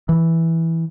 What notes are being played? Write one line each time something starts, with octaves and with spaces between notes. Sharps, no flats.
E3